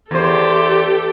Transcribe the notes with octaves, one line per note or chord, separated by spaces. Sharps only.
E2 G4 A4 C5